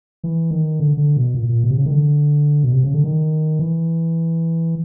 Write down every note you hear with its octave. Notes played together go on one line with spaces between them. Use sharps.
E3
D#3
D3
D3
B2
A#2
A#2
B2
C3
C#3
D#3
D3
B2
C3
C#3
D3
D#3
E3